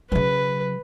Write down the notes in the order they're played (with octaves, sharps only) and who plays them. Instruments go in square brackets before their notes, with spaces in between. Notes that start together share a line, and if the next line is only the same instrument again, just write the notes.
[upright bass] C#3 F#3 [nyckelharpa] B4